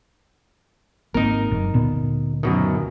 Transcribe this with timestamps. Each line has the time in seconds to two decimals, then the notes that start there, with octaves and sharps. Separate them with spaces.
1.14 G#1 A#3 C4 D#4 A#4
1.51 F#1
1.74 D2 A#2 B3
2.43 F#2 B2 D#3